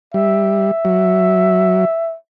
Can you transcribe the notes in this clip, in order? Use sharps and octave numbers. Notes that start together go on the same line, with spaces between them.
G3 E5
F#3